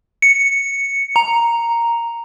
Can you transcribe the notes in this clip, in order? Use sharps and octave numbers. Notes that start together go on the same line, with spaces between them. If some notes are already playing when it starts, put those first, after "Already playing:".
C#7
A#5